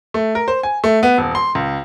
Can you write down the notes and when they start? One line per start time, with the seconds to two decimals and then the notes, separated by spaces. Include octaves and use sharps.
0.14 A3
0.35 A#4
0.48 C5
0.63 G#5
0.84 A3
1.03 B3
1.18 D#1
1.35 C6
1.55 C#2